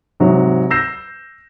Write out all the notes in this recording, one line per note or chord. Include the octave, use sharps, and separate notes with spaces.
G#2 C3 F#3
E6 G6 A#6 C7 E7